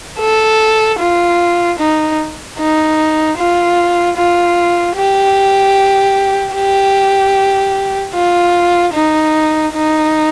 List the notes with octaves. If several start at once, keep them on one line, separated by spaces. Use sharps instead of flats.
A4
F4
D#4
D#4
F4
F4
G4
G4
F4
D#4
D#4